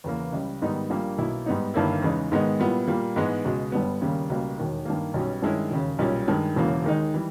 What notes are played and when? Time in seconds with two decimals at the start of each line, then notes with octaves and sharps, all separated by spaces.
0.04 E2 C#3 E3 A#3
0.32 C#2 C#3 G3
0.62 G#2 D#3 G3 B3 D#4
0.90 A#1 A#2 G3 A#3
1.18 B1 B2 A#3 E4
1.46 G#2 G3 B3 D#4
1.74 G1 G2 D#3 A#3 E4
2.02 E2 C#3 E3 G#3 D#4
2.32 G#2 D#3 G#3 B3 D#4
2.60 A#2 G3 B3 E4
2.88 A#2 G3 A#3
3.16 G#2 E3 G#3 B3
3.44 C#2 B2 G#3
3.72 G1 G2 G3 B3
4.01 D#2 C#3 G3 A#3
4.30 C#2 B2 G3 A#3
4.58 E1 D#2 D#3
4.85 G2 D#3 A#3
5.14 B1 B2 G3 C#4
5.42 G2 D#3 G#3 C#4 E4
5.71 E1 D#2 C#3
5.99 B1 A#2 G3 C#4
6.27 G2 D#3 G#3
6.56 E1 E2 C#3 E3 A#3
6.84 D#2 D#3 G#3 D#4
7.14 E3 G3